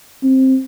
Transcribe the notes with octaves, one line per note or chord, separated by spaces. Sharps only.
C4